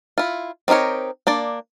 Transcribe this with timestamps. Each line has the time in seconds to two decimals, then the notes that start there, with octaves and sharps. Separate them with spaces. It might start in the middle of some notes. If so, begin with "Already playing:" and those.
0.18 E4 F4
0.68 C4 D#4 G4 A#4 C#5
1.27 A#3 D4 D5